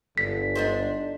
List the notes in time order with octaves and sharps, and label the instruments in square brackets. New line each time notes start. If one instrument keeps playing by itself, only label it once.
[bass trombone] G1 [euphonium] D3 [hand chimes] B6
[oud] D4 D#4 C5